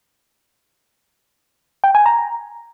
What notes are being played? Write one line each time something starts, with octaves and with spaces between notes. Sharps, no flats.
G5
G#5
A#5